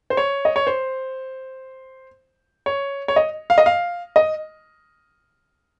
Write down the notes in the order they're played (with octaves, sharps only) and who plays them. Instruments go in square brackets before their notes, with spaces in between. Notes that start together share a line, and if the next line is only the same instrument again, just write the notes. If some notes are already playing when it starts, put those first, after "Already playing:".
[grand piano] C5
C#5
D#5
C#5
C5
C#5
C#5
D#5
F5
D#5
F5
D#5